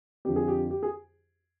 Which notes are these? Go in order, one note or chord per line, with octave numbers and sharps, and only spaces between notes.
F2 D3 F3 G4
G#4
G4
G4
G#4